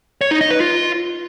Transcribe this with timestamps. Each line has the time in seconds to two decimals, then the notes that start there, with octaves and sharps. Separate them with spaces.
0.21 C#5
0.31 D#4
0.41 D#5
0.51 B4
0.60 F4